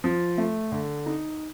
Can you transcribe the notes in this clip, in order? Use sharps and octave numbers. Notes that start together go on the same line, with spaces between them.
F3
A3
D3
D#4